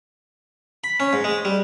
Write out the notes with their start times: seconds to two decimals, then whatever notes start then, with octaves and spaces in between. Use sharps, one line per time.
0.84 B5
1.00 C#4
1.13 G#2
1.24 G#3
1.45 G3